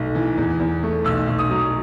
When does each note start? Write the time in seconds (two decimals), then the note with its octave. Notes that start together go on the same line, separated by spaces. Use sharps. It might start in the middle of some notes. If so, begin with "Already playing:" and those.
Already playing: B1 A3
0.15 E3
0.38 E2
0.60 E2
0.83 A3
1.05 B1 E6
1.27 B1
1.39 D#6
1.50 F#3